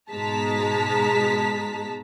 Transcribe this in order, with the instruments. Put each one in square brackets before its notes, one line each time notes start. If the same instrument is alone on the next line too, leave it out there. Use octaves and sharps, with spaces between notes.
[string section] G#2 B2 G#3 A5 A#5 B6